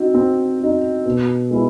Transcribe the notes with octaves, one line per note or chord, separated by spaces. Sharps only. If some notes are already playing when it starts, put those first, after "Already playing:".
Already playing: C4 D#4 F#4
C4
D#4 F#4
B2
G#3 B3 E4